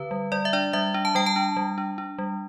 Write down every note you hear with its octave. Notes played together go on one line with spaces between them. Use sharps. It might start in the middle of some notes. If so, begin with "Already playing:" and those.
Already playing: D3 B4
G3
G3 D5
E5
D4 D5
G3 E5
D4
A5
G3 G5
A5
D4
G3
D4
D4
G3